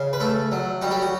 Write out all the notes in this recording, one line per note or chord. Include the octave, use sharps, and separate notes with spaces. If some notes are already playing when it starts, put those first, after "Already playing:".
Already playing: C#3
B4
A3 A4
F#3
G3 F#4
G4
F#4